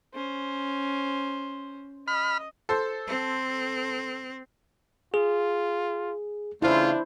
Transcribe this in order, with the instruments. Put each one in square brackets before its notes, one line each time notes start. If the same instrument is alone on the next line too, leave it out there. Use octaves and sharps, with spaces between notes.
[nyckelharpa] C#4 C5
[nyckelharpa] D#5 [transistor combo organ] B5 F6
[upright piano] A4 C5 C6
[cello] C4
[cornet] F4 [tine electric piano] G#4
[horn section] C#3 A3 F4 [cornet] D4 [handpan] E4 C5